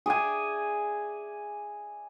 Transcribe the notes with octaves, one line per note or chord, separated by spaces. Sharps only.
G#4 D5 E5 G#5